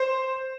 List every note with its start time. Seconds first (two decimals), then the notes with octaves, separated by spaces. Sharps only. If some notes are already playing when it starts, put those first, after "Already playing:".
Already playing: C5